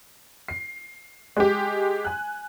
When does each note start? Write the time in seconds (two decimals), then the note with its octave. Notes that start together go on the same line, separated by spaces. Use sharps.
0.48 C7
1.37 G#3 G4
2.05 G#5 F#6